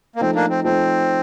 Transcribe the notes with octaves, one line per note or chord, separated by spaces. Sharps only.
A#3
F3 A3 C4 D#4
A#3 D4
C4
F3 A3 C4 D#4